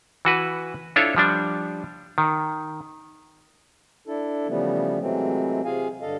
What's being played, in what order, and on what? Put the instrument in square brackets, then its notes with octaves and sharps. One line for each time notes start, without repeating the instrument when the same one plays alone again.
[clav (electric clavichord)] E3 F#4 B4
D4 E4 F4 A4 C#5
F3 G3 D4
D#3
[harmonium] D4 E4 A4
C#3 E3 F3 G3 A3 B3
C3 E3 F#3 G#3 A3 C4
C3 F4 G#4 F5 G#5
G2 D3 A4 D#5 F5